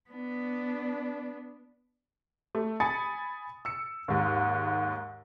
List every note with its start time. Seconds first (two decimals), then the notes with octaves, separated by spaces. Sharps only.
0.10 B3 D4
2.55 A3
2.80 G#5 B5 D#6 A6 C#7
3.65 E6 C#7
4.08 D#2 G#2